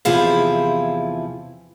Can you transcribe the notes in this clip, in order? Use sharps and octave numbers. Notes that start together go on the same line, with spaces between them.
E2 C3 F3 E4 G#4 F5